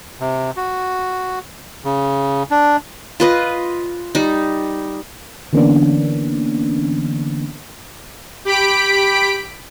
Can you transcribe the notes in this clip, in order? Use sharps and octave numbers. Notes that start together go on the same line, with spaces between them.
C3
F#4
C#3
D4
F4 B4 D#5
G3 D#4
D3 E3 A#3 B3 C#4 D4
G4 B5 B6 D7